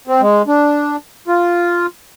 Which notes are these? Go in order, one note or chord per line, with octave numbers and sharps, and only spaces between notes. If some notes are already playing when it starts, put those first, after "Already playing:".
C4
G#3
D4
F4